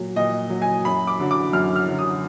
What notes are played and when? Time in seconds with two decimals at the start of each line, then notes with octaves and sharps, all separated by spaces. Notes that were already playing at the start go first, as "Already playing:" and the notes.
Already playing: A#2 F#3
0.16 A#2 D#5
0.50 F#3
0.62 G#5
0.85 F#2 B5
1.07 D6
1.19 D3 F#3
1.31 D6
1.53 F#2 F6
1.76 F6
1.87 D3 F#3
1.99 D#6